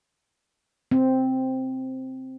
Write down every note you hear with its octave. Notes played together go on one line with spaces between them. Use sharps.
C4